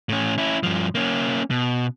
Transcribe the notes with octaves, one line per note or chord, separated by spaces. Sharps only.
A2 C#4
C#4 E4
G2 F3
A#3 C#4
B2